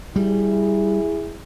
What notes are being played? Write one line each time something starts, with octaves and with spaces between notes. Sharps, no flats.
G3 E4 G#4